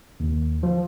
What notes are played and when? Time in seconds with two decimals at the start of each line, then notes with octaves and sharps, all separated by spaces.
0.20 D#2
0.63 F3